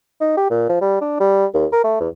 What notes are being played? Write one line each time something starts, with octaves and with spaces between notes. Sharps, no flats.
D#4
G4
A#2
F3
G3
D4
G3
D#2
A#4
A3
E2